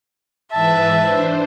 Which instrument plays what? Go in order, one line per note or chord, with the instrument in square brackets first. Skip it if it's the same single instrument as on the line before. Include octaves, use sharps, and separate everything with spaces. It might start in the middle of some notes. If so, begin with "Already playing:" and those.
[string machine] G#2 E3 B4 [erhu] E5 [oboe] A5
[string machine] D4 C5